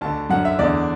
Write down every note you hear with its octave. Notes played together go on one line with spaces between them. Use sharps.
D2 D3 A5
F#2 D3 F#5
E5
E2 D3 D5